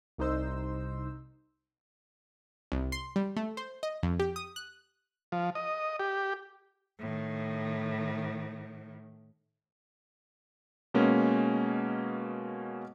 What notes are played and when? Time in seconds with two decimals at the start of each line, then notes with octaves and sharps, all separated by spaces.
0.18 C2 D#4 C5 E6
2.72 C2
2.92 C6
3.16 G3
3.36 A3
3.57 C5
3.83 D#5
4.03 F2
4.19 G4
4.36 D#6
4.56 F#6
5.32 F3
5.55 D#5
6.00 G4
6.99 A2 D#3
10.94 B2 G#3 A#3 C#4